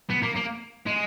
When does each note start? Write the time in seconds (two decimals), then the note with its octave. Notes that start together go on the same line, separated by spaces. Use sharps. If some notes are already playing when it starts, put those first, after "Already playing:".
0.10 B3
0.22 A#3
0.36 A#3
0.87 G#3